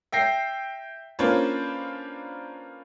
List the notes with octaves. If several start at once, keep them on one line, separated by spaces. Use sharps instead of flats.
E5 G5 A#6 C7
A#3 C#4 D4 F4 B4 C5